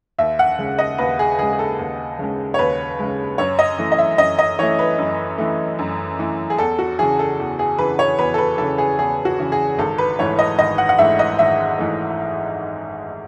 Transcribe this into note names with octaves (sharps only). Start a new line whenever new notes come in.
D#2 E5
F#5
C#3 G#3
D#5
D#2 B4
G#4
C#3 G#3 G#4
G#4
A4
D#2
C#3 G#3
C#5
D#2 B4
C#3 G#3
F#2 C#5
D#5
E3 A3
D#5
E5
F#2 D#5
D#5
E3 A3 C#5
B4
F#2
E3 A3
F#2
E3 A3
G#4
E2 A4
F#4
C#3 E3 G#4
A4
E2
G#4
C#3 E3 B4
C#5
E2 B4
A4
B4
C#3 E3 A4
G#4
E2 G#4
F#4
C#3 E3
G#4
G#1 A4
B4
G#2 E3 A3 C#5
D#5
G#1 D#5
F#5
F#5
G#2 E3 A3 E5
D#5
G#1 E5
G#2 E3 A3